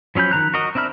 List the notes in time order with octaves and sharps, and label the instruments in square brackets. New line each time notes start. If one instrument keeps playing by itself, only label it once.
[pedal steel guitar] F3 F#3 C#4 B5 G6
D#3 G3 A#5 F#6
F#4 A#4 D#5
C4 D4 E5 B5 F6